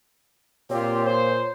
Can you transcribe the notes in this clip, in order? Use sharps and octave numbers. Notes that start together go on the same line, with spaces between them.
A#2 C4 F4 G4 C#5
C5